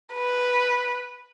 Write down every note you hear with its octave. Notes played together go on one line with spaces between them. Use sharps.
B4